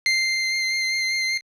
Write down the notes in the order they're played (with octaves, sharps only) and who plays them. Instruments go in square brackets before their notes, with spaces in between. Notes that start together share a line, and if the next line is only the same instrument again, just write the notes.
[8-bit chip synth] C7